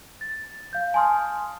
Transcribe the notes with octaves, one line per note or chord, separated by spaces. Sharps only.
A6
F5 G6
G#5 A5 C6 D#6 F6